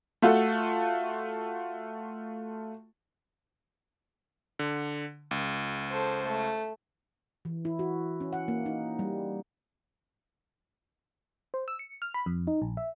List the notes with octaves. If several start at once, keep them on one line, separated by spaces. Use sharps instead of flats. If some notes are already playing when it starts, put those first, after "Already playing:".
A3 F4 F#4 A4
D3
C#2
A4 C5
A3
E3
E4
F#4
C#4
F#5
A#3
D#4
G3
C5
E6
C#7
F6
B5
F2
D#4
A#1
E5